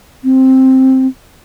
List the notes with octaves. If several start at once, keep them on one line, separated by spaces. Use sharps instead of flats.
C4